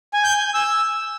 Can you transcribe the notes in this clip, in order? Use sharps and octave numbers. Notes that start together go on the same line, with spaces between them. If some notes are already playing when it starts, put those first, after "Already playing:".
G#5
G6
G#5
G#5
E6